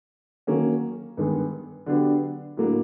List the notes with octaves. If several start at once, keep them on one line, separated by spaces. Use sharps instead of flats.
D#3 F#3 A#3 C#4
G2 D#3 G#3 B3
D3 F#3 B3 D4 G4
A2 F#3 A#3 D4